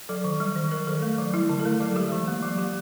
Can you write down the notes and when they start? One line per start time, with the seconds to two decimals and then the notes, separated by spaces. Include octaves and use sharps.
0.09 F#3 A4
0.24 D#3
0.40 G3
0.56 D#3
0.71 F#3 A#4
0.87 D#3 A4
1.02 A3
1.18 F#3
1.34 G3 E4
1.49 D3
1.60 A4
1.65 A3 A#4
1.80 F#3 A4
1.96 G#3 G4
2.12 E3
2.27 A#3
2.43 F#3
2.58 A#3 G4